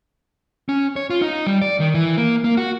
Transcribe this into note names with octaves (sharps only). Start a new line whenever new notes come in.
C#4
C#5
F4
D#4
G3
D5
D#3
E3
A#3
A#3
F#4